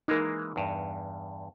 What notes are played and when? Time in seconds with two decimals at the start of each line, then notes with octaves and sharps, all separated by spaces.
0.08 E3 G#3 A#3 D#4 A#4
0.56 E2 G2